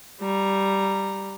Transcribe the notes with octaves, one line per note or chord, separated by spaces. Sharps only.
G3 A#5